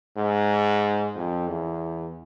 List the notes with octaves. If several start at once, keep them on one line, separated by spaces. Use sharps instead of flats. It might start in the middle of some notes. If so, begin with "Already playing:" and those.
G#2
F2
E2